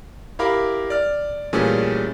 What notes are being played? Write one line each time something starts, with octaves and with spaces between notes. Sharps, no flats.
E4 G4 A#4 F5 B5 D6
D5 F6
A#2 E3 G3 A3 C#4 G#4